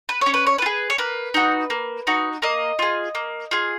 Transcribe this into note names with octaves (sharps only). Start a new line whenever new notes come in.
B4
C#4 C#5
B4
C#5
F4 B4
G#4
C#5
A#3 B4
D#4 F#4
A#3
D#4 F#4
A#3 D#5
F4 G#4
A#3
F4 G#4